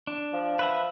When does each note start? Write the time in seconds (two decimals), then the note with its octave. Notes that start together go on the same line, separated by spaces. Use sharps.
0.07 D4
0.33 F3
0.59 B4 E5 F#5